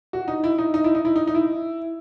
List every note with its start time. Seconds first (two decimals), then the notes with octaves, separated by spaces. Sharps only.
0.13 F#4
0.28 D#4
0.44 E4
0.58 D#4
0.74 D#4
0.84 E4
0.95 D#4
1.05 E4
1.16 D#4
1.27 D#4
1.35 E4